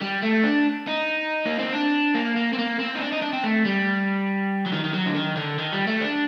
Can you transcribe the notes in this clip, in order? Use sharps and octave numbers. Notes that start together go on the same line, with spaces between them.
G3
A3
D4
D#4
A#3
C4
D4
A#3
A#3
C4
A#3
C4
D#4
D4
D#4
D4
C4
A3
G3
F#3
D#3
D#3
F#3
D3
D#3
D3
D#3
G3
A3
D4